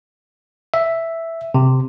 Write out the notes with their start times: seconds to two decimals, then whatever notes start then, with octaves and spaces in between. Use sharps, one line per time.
0.74 E5
1.54 C3